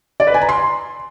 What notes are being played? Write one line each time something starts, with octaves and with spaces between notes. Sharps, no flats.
D5
B4
G#5
A#5
C6